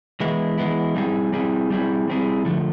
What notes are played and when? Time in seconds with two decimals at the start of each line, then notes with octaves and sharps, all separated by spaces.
0.20 E3 G#3 B3 E4
0.58 E3 G#3 B3 E4
0.96 G3 C4 E4 G#4
1.32 G3 C4 E4 G#4
1.70 G3 C4 E4 G#4
2.08 G3 C4 E4 G#4
2.45 D3 F3 A3